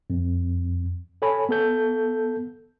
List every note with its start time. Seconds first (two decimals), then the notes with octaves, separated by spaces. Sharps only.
0.10 F2
1.22 A4 C#5 G#5 B5
1.49 B3 A4 G6